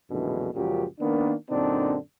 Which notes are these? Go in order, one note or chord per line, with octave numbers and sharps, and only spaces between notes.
A#1 F#2 B2 D3 E3 G#3
C#2 F#2 A#2 F3 F#4 G4
D#3 A#3 B3 D4
F#2 A#2 D3 C4 D4 D#4